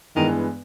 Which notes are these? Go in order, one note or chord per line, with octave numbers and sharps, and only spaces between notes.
G2 D#3 E3 G#3 B3